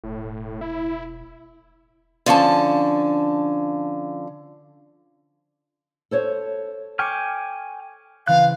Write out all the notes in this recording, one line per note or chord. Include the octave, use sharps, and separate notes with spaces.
E1 A2
E4
D3 F3 C#4 A5
A4 C5 C#5
G5 G#5 C#6 D6 F6 C#7
C#3 E3 C4 F5 F#6